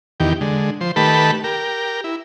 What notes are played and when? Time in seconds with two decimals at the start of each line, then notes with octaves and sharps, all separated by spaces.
0.20 E2 D#3 G4
0.41 D3 G#3
0.81 F3 C5
0.96 D#3 A3 G4 B4 A5 B5
1.44 G4 A#4
2.04 E4